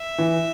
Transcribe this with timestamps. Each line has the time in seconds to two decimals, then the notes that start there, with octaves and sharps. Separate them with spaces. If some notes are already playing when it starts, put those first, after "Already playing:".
Already playing: E5
0.18 E3